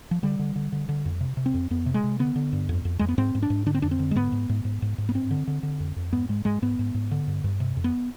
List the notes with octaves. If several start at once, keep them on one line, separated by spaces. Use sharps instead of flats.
F3
D3 G3
D3
D3
D3
D3
F2
C3
C3
C4
F2
F2 B3
C3
G#3
C3
D3 B3
D3
G2
F2
F2
F2 G#3
B3
G#2 C4
G#2
D4
G#2
D3 D4
C4
F2 D4
C4
D3
G#3
G#2 B3
G#2
G#2
G#2
G#2
G#2
B3
G2 C4
D3
D3
D3
F2
F2
G#2 B3
G#2 G#3
G#2 G#3
G#2 B3
G#2
G#2
D3
G2
G2
C3
F2
B3